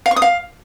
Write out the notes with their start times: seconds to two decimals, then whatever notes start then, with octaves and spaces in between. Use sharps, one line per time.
0.06 F5
0.11 C#6
0.16 D#6
0.22 F5